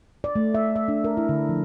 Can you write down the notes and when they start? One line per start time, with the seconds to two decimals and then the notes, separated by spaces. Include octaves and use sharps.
0.24 D5
0.36 A3
0.54 E5
0.76 E5
0.88 D4
1.04 A#4
1.17 E4
1.29 D3
1.49 F3